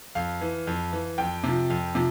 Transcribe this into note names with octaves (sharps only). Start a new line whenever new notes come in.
F2 F5
E3
F2
E3
F2 G5
C3 F3
F2
C3 F3